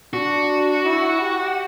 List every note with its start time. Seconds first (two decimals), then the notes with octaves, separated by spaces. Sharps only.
0.13 D4 F#4
0.85 E4
1.21 G4